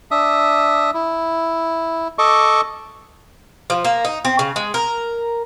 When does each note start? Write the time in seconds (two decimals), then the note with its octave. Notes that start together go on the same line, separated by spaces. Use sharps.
0.11 D4 E5 D#6
0.94 E4
2.18 A4 D#5 C#6 D6
3.70 F3
3.85 A#3
4.05 D#4
4.25 C4
4.39 C#3
4.56 G#3
4.74 A#4